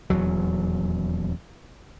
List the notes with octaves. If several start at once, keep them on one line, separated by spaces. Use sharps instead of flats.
D#1 B1 E2 F#3